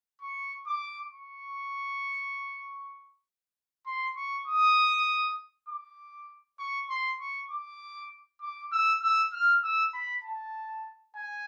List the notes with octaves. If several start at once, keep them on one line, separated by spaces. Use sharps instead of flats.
C#6
D6
C#6
C6
C#6
D#6
D6
C#6
C6
C#6
D6
D6
E6
E6
F6
E6
B5
A5
G#5